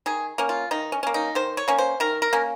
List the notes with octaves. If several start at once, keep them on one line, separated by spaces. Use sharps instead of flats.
D#3 G#4
A#3 C#4
F4
D#3 D#4
C#4
A#3 C#4
D#4
D#3 C5
C#5
A#3 C#4
C5
D#3 A#4
A#4
A#3 C#4